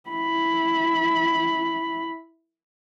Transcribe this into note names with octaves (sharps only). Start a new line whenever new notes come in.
E4 B5